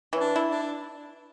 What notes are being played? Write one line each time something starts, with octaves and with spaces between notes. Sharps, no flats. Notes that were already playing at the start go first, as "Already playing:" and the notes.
E3 C#4
D4
E4
D4